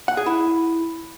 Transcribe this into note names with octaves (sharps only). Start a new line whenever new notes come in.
F#5
G#4
E4